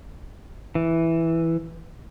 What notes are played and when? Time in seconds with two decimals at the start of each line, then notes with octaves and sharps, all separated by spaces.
0.75 E3